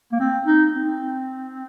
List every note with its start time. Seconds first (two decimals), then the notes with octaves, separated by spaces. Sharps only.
0.12 A#3
0.20 C4
0.47 D#4
0.74 C4